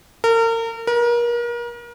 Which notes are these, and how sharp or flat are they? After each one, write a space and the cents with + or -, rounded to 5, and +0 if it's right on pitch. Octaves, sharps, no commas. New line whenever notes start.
A#4 -35
A#4 +35